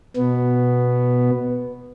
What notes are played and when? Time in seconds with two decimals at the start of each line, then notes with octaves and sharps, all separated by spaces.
0.16 B2 B3